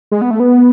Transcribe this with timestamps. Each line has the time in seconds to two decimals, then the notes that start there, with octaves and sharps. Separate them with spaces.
0.12 G#3
0.22 B3
0.31 A3
0.40 B3